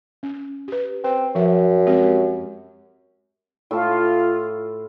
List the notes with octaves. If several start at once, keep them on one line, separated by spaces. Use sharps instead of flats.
C#4
G4 B4
C4 B4
F#2 F3 E5
G#3 C4 G4
A2 F4 A5